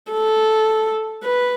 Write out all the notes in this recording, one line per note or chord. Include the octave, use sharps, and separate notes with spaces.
A4
B4